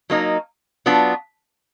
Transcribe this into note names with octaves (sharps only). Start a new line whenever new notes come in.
F#3 A#3 D#4
F#3 B3 D4 F4